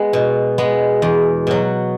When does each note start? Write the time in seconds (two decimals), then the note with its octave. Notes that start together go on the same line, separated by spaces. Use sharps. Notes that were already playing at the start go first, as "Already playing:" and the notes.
Already playing: G#3 B3
0.13 B2
0.58 G#3 B3
1.02 E2
1.47 B2 F#3